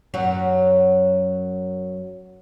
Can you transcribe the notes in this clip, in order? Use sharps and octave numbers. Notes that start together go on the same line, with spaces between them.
F#2 F#3 F#4